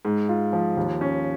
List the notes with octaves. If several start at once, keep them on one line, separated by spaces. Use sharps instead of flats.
G#2
F4
F3
D#2
C#4